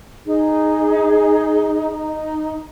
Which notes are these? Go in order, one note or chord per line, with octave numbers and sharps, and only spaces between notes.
D#4 G#4
D#4